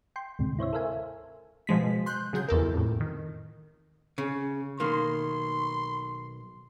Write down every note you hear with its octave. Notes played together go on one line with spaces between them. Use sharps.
G5 C6
D2 G#2 C3
E4 C5 C#5 E5
A4 A#4 C5 E5 F5 G#5
B2 F3 G#3 B6
C6 F#6 G6
C#3 F#3 G#4 G6
A#1 E2 A4 A#4
F2 A2
D#3
C#3
B1 D#3 A#3 C6